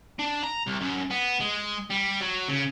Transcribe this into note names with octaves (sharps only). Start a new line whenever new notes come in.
D4
A#5
C2
F#2
B3
G#3
G3
F#3
C#3